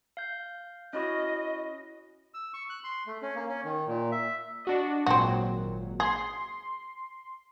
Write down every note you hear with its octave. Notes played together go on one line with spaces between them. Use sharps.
F5 G6
C#4 E4 F#4 D#5
E6
C#6
F#6
C6
A3
C#4
A#3
C#4
D#3
A#2
E5
D4 F#4 D#5
G#1 A#2 F#3 C4 F#4
G#4 C6